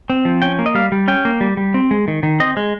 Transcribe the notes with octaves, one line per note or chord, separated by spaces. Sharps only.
C4
F3
C#4 G5
A#3
D#5
G3 F5
G3
C#4 G5
A#3
G3
G3
C4
G#3
D#3
D#3
C4 D#5
G#3